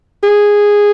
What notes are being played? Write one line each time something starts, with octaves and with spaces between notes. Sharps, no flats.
G#4